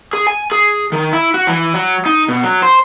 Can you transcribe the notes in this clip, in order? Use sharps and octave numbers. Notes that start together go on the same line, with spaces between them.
G#4
G#5
G#4
D#3
E4
F#4
E3
F#3
D#4
B2
F#3
C5